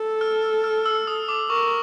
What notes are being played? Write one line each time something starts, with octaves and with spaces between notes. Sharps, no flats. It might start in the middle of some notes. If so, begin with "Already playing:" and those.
Already playing: A4
F6
F6
E6
D#6
D6
A#4 C#6